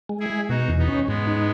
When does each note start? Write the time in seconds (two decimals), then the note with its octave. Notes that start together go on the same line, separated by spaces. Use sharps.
0.09 G#3
0.20 E4 G#4
0.30 G#3
0.49 B2 D#4 F#4
0.68 E2
0.79 B3 D#4
0.88 C#4
1.07 G#2 G#3 B3
1.27 D#4